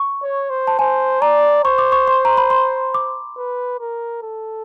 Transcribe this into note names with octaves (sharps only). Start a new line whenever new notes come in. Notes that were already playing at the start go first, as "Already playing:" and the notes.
Already playing: C#6
C#5
C5
A5
C5 G#5
D5 A#5
C5 C#6
D6
C#6
C6
A#5
B5
C6
D6
B4
A#4
A4